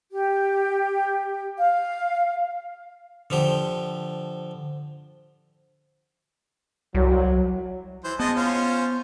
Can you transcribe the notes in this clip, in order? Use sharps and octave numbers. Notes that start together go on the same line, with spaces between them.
G4
F5
D3 F3 G4
C2 F#3
E3 C5
G#3 B3 D#5 A5
C#4 F4 C5